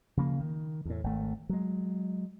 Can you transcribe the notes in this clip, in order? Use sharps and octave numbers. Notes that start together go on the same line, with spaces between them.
C#3 F3 A#3
D#3
E2 A2
G#1 A3
F#3 G#3